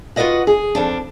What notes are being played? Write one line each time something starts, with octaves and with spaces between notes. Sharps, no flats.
F4 F#4 A#4 B4 D#5 F#5
G#4
F2 F3 D4